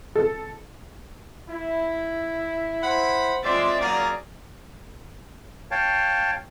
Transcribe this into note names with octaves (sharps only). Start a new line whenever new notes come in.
A4
E4
C5 F#5 B5
G#3 C4 F4 D5 E5 C6
F#3 A#3 C#4 G#4 F5 A#5
C#5 F5 G5 A5